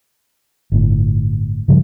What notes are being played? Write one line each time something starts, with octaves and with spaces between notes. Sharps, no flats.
G1 A2
G2 C#3 F3 G3